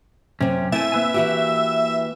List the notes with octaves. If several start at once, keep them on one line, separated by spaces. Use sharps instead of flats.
F#2 C3 C4 C#4
A3 C4 E4 E5 G5 G#5
A#3 B4 G#5
E3 F#4 G4